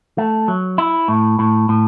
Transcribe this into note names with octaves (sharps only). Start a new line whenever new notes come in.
A3
F#3
E4
A2
A2
A2